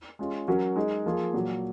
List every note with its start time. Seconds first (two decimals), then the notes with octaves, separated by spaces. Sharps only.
0.19 G#3 C#4 F4
0.48 F#3 C#4 F#4 A#4
0.76 G#3 D#4 G#4
1.06 F3 A#3 F4 G#4
1.34 A#2 F#3 A#3